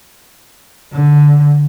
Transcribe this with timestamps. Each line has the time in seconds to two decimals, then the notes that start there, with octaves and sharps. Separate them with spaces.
0.93 D3